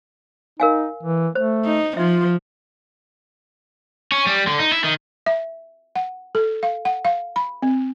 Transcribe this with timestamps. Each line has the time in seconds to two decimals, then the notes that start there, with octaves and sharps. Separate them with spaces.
0.60 D#4 A#4 F5 G#5
1.03 E3
1.35 A3 C5
1.65 D#4
1.97 F3 D#4 F4 E5
4.12 C#4
4.27 G3
4.47 D3
4.59 D#4
4.72 E4
4.84 D#3
5.26 E5
5.96 F#5
6.35 A4
6.63 F5
6.85 F#5
7.05 F5
7.36 B5
7.62 C4